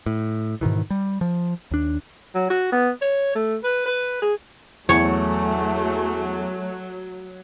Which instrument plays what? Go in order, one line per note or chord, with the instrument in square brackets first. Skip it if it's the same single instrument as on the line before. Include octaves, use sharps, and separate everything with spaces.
[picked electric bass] A2
G#2 B2 D#3 E3
G3
F3
D#2 D4
[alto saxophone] F#3
F#4
B3
C#5
A3
B4
B4
G#4
[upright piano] E2 [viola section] F#3 [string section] A3 [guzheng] C#5